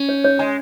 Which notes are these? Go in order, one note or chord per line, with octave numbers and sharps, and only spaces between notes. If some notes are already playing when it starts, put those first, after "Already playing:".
Already playing: C#4
C#5
C#5
G#3 G#5